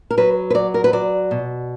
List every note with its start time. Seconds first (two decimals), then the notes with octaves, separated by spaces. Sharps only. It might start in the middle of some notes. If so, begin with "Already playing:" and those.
0.11 A#4
0.17 F#3 B4
0.50 B4
0.54 F#3 D5
0.74 A#4
0.84 B4
0.93 F#3 D5
1.31 B2